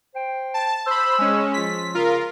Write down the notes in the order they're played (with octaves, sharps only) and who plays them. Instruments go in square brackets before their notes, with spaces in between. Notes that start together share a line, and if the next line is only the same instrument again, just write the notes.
[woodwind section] C5 G5
[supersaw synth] A5
[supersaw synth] C5 B5 [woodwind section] E6
[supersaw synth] G#3 C#4
[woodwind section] F3 F4 [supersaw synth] B6
[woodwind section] C#3 [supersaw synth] F4 A#4